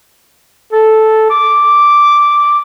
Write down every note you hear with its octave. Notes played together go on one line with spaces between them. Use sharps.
A4
D6